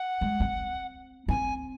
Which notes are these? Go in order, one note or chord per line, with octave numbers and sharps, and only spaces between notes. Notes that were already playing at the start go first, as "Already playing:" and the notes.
Already playing: F#5
G#3
C4
C4 G#5